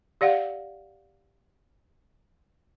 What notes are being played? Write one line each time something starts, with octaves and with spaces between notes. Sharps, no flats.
G4 D5 F5 F#5